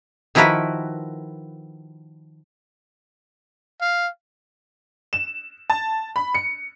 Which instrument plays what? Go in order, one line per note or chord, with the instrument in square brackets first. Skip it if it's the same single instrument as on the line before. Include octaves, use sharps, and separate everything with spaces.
[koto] D#3 F3 E4 F#4 A#4 B4
[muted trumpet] F5
[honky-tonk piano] E7
A5
B5
C#7